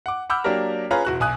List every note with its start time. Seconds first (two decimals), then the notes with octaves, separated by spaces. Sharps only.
0.06 F#5 D6
0.30 F#5 B5 D6 E6 F6 G6
0.44 F#3 A#3 D4 G4 A#4
0.91 C#4 F4 G#4 B4 C#5 A#5
1.05 E1 F#4 F#6
1.20 B1 G#5 D#6 F#6